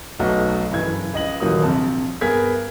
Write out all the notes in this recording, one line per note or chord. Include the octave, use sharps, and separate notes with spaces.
B1 B2 F#3 A3 D#4 F#5
F#1 G2 E3 G#6
C#2 D#5 F#7
D#1 E3 F#3 A#3 D#6
A#1 C3 A5
G2 B3 G#4 A#4 G#6 B6